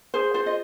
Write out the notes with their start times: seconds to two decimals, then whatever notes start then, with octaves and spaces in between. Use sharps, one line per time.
0.14 G#4 C5
0.34 F4 C5
0.46 D#5